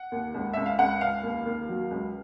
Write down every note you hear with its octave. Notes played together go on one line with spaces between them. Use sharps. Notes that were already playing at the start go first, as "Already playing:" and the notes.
Already playing: F#5
D#2
C#2
C#2 E5
F5
C#2 F#5
C#2 F5
D#2
D#2
F#3
C#2